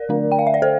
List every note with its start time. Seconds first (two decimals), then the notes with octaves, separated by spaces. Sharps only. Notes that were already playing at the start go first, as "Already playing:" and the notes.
Already playing: A#4 D5
0.09 D3 A3 D4
0.32 G5
0.39 F5
0.47 E5
0.54 D5
0.62 A4 C5